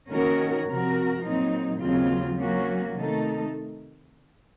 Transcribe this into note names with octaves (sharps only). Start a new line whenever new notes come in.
D#3 A#3 C#4 F#4 A#4
C3 F3 C4 F#4 A#4
A#2 F#3 C4 D#4
D#2 C#3 F#3 C4 F4
F#3 A#3 C#4 F#4
C3 D#3 A3 D#4 A4